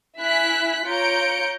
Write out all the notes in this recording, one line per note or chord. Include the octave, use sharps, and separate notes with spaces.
E4 G#5 F#6 B6
F4 C#5 A#5 G6 C#7 D7